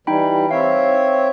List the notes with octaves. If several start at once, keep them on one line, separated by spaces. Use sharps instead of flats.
E3 G3 D#4 G5 B5
C4 C#5 E5 F5